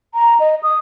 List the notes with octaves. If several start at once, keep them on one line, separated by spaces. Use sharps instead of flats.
A#5
D#5
D#6